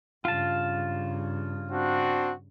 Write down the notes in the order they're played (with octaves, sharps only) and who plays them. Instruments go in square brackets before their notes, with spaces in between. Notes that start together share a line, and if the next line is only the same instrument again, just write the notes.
[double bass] G2 C#3 [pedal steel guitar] F4 A5
[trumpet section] C4 D4 F#4